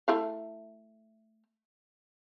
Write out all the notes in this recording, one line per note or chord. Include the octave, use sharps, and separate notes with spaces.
A3 E4 F5